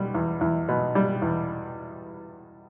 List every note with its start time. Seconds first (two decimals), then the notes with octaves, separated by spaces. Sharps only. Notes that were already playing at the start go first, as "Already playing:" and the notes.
Already playing: B2 G3
0.15 E2
0.41 E2
0.69 B2
0.95 G3
1.22 E2